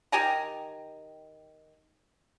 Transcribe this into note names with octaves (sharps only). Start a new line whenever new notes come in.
D#3 G4 G#5 A#5